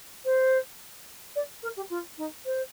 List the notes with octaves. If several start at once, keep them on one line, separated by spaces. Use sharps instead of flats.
C5
D5
A#4
G4
F4
D#4
C5